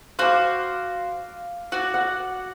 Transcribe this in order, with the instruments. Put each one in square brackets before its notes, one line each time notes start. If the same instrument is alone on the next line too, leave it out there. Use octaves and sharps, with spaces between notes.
[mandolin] F#4 C5 [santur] F5 D6
[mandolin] F#4 D5 [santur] F#5
[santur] F#5